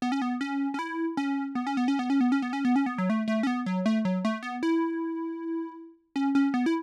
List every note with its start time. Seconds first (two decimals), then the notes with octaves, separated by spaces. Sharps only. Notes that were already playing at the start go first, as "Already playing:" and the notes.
0.02 B3
0.12 C#4
0.22 B3
0.41 C#4
0.74 C#4
0.79 E4
1.17 C#4
1.55 B3
1.67 C#4
1.77 B3
1.88 C#4
1.99 B3
2.10 C#4
2.21 B3
2.32 C#4
2.42 B3
2.53 C#4
2.65 B3
2.76 C#4
2.86 B3
2.98 F#3
3.10 A3
3.28 A3
3.43 C#4
3.47 B3
3.66 F#3
3.86 A3
4.05 F#3
4.25 A3
4.43 B3
4.63 E4
6.16 C#4
6.35 C#4
6.54 B3
6.66 E4